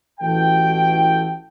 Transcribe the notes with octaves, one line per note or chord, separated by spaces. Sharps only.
A1 E3 F#4 A4 G5